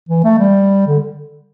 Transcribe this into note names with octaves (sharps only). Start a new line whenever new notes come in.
E3
A3
G3
D3